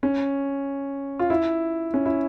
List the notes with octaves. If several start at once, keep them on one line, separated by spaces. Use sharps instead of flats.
C#4
F4
E4
C#4
E4